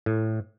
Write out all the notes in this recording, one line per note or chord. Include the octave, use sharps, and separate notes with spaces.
A2